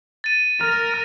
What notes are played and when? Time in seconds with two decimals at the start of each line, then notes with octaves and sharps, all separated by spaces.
0.24 A6 D#7
0.61 A#4 A#5 F6